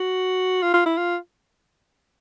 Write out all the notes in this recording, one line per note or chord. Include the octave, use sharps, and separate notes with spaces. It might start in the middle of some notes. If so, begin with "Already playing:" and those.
Already playing: F#4
F4
F4
E4
F4